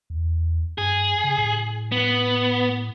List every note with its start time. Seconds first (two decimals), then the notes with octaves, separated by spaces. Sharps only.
0.10 E2
0.78 G2 G#4
1.24 C#3
1.38 A2
1.92 B3